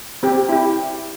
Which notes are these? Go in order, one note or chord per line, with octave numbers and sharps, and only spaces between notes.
C4 G4
E4 G4